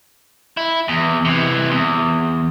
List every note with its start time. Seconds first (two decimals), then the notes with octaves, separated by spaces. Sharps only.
0.57 E4
0.88 E2
1.25 C3 E3
1.71 E2